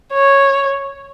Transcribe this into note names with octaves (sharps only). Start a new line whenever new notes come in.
C#5